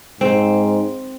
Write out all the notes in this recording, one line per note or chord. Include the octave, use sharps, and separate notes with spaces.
G#2 C4